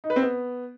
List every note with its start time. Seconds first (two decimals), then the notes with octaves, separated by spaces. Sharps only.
0.04 D#4
0.10 B4
0.16 C4
0.22 B3